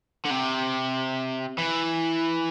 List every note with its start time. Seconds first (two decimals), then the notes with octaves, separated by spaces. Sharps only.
0.25 D3
0.30 C3
1.58 E3